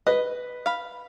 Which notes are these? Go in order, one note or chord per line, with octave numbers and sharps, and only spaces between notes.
B4 D#5
F5 B5